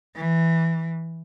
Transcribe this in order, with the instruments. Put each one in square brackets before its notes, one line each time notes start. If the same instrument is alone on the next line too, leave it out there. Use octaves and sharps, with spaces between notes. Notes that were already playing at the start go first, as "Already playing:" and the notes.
[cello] E3